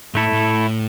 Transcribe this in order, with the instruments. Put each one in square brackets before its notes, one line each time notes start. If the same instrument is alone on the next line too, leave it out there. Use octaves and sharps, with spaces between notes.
[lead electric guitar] A2 [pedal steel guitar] A3 E4 A4
[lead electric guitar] A2